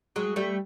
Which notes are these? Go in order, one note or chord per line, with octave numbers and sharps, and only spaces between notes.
F#3 G#3
G3 A3